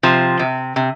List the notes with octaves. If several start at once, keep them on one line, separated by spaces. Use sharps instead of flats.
C3 F3
C3
C3